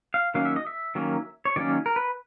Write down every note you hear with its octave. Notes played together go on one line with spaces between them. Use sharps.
F5
D#3 F#3 A#3 C#4 F5
E5
D#5
E5
D#3 F#3 A#3 C#4
C#5
D#3 F#3 A#3 C#4 D5
A#4
B4